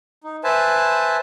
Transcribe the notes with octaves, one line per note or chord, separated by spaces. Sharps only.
D#4
B4 C5 E5 G#5 A5